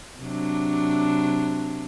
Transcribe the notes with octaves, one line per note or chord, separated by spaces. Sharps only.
C3 F#3 D4